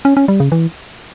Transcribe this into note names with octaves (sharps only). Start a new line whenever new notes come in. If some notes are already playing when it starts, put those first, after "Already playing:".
C#4
C#4
G3
C#3
E3